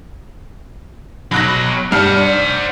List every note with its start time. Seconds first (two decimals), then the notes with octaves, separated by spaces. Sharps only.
1.32 B2 F#3 B5 F#6 A#6
1.92 G2 C5 F#5 A5 F6
2.17 D4